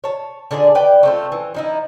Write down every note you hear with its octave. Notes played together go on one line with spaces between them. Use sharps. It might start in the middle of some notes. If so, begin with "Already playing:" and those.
C#5 A5
D3 D4 G#4 D5
B4 D5 G5
A3 C4 F4
E3
F3 D#4 E4